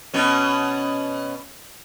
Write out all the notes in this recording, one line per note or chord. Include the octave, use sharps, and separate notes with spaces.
B2 C#4